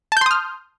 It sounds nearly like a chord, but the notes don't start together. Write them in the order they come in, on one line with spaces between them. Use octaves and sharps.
A5 G6 C6 D#6 F6